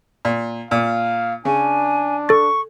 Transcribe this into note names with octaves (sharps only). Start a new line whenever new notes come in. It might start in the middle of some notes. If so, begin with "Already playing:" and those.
A#2
A#2 F5
C#3 D4 G#5
A4 C#6 A6